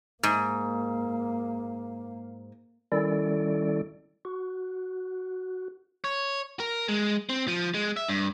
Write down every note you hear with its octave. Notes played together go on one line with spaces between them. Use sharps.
G#2 A#3
D#3 G3 C#4 E4 A4 D5
F#4
C#5
A#4
G#3
C4
F3
G#3
E5
G2